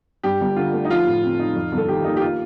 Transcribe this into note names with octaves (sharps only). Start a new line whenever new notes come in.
G2 G4
G1
D3 F4
A3
D#4
F3 F4
A2
C4
D#4
F2
G1 A4
D#3 G4
A#3 D#4
G4
F4